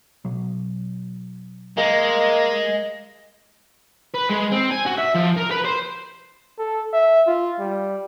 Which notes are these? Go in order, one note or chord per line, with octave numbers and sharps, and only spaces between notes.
B2 F#3
G#3 A#3 D#5
B4
G#3
C4
G#5
F#4
E5
F3
A#4
B4
C5
A4
E5
F4
G3